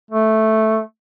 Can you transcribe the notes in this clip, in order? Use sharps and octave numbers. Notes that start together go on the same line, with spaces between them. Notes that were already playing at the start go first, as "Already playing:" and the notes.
A3